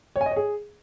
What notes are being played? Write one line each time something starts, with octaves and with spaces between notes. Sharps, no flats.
C#5
G#5
D#5
C#5
G#4